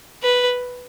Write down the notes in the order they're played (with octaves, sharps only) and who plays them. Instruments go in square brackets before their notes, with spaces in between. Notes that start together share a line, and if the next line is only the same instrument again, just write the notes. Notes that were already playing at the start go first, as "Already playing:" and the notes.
[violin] B4